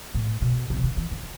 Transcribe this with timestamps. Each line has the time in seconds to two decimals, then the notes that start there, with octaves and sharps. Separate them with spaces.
0.14 A2
0.42 B2
0.70 C3
0.76 E3
0.84 D3
0.97 E3
1.11 D3